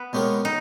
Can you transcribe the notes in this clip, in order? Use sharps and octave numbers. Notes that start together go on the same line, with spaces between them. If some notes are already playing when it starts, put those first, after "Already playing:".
Already playing: B3
B2 G#3 C#4 G4 A#4
D#4